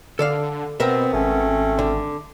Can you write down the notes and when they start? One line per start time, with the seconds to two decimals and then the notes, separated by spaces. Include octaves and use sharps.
0.19 D3 A4 D5 F5
0.80 B2 B3 C4 A#4 E5
1.14 G#1 A3 C4 C#4
1.79 D3